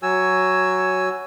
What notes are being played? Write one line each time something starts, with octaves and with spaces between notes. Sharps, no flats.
F#3 F#4 G#5 E6